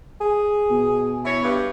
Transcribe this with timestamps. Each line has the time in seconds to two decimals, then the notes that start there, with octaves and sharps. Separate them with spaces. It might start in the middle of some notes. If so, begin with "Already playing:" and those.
0.21 G#4
0.70 B2
1.25 E3 E4 C#5
1.43 G2